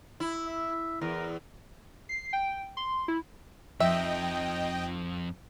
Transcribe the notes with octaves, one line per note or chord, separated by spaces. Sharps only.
E4
E5
E2 A#4
C7
G5
C6
E4
F2 F3 D#4 D#5 E5 G5